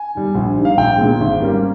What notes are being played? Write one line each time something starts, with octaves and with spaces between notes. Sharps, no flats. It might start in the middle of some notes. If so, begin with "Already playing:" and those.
Already playing: G#5
D#3 G3
A#1
G#2 D#3 G3
F5
A#1 G5
A#2 G#3
G#1
G#2 G3 A#3 C#4